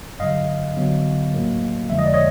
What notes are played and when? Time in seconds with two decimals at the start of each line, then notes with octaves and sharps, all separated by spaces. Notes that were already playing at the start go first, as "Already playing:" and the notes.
0.20 G2 D3 F#3 D#5 F5
0.77 D3 F#3 B3
1.34 A2 F#3 A#3
1.90 F2 D3 F3 G#3 E5
1.99 D#5
2.06 D5
2.14 C#5 D#5